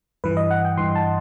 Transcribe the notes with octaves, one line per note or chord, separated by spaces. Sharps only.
G2 E3 B4
D#5
F#5
G5
G2 E3 C6
A5